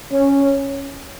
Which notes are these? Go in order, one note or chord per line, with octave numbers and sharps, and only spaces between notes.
C#4